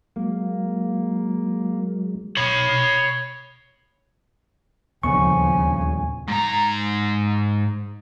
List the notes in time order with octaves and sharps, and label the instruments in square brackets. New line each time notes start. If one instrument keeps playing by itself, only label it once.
[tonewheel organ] F#3 G#3 [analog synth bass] A#3
[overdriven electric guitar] C#5 B5
[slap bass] D#1 D2 B3 [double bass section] C#3 F3 [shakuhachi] G#5 [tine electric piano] C#6
[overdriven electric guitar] G#2 A#5